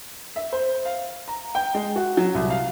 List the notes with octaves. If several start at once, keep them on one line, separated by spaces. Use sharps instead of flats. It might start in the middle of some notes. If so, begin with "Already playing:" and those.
E5
C5
F5
A#5
G5
G#3
F#4
F#3
C2
F5